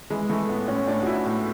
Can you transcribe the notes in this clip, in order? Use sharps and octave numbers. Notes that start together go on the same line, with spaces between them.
E3 G#3
E3 A3
A2 B3
A2 C#4
A2 D4
F#4
A2 E4
A2